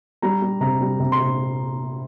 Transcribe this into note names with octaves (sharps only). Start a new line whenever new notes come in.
G3 A#5
G3
C3 A#5
G3
C3
C6
C3